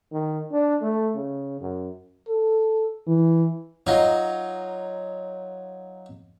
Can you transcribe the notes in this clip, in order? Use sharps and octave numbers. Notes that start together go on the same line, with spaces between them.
D#3
D4
A3
C#3
F#2
A4
E3
F#3 D#4 F4